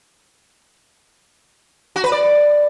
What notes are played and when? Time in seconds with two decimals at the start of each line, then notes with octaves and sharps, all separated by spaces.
1.96 F#4
2.04 B4
2.12 D5